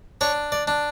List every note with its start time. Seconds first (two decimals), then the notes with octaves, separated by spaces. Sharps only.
0.21 D4 C#5
0.52 D5
0.68 D4